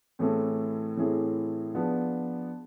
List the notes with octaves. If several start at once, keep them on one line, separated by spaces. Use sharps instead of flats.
A2 E3 A3 C4 G#4
A2 E3 A3 C4 G#4
F3 B3 D4 G#4